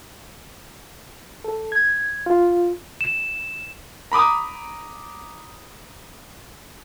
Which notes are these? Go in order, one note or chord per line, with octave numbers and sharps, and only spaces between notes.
A4
G#6
F4
E7
A#5 B5 D6 D#6